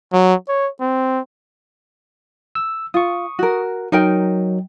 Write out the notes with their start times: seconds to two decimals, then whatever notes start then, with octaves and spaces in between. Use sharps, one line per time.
0.13 F#3
0.48 C#5
0.81 C4
2.55 E6
2.94 F4 C#6 D#6
3.39 F#4 A#4
3.92 F#3 D#4 A#4 G5